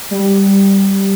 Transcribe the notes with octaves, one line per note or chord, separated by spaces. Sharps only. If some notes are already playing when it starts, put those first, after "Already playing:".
G3